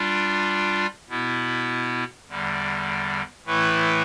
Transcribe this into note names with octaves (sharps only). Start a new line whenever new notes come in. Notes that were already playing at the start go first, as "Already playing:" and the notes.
Already playing: G3 D4 F4
B2 B3 E4
E2 D3 G3
A2 E3 A3 E4 B4